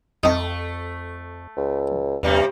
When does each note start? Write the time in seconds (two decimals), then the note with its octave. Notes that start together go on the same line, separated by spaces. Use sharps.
0.23 F2 A3 C4 D#4
1.57 C#2
2.23 E2 G2 C3 G3 A#3